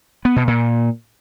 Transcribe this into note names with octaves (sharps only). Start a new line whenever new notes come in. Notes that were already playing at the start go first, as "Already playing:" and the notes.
B3
B2
A#2